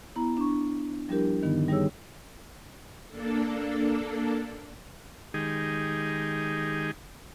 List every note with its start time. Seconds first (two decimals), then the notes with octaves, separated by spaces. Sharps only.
0.16 B3 E4 A#5
0.37 D4 C#6
1.08 F3 G3 D4 E4 G4 A#4
1.42 G2 D3 D#3 B3 D#4
1.68 G3 D#4 G4 G#4 C#5 E6
3.09 A#3 D4 A4
5.34 D#3 G#3 D#4 G4 G#4